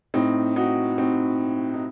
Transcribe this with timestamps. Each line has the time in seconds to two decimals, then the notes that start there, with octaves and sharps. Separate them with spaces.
0.14 A2 C4 D#4
0.56 D#4 F#4
0.98 C4 D#4
1.74 D#4